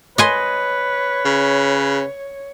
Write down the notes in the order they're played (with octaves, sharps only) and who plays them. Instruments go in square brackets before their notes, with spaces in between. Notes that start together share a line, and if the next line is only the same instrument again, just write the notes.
[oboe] B4 [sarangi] C#5 [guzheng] D#5 G#5 C6
[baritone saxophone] C#3